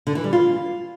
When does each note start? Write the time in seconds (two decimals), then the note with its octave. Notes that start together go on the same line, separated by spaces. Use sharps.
0.07 D3
0.15 E3
0.24 G3
0.33 F4